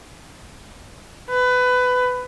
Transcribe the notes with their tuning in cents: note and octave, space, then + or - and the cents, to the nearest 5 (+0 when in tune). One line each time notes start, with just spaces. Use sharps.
B4 +20